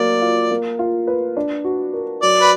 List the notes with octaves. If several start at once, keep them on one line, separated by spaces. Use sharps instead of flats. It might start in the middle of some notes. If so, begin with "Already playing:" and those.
Already playing: F#3 A#3 D5
F4
A#3
F4
B4
D4
F#4
A#4
F#3 D5
B4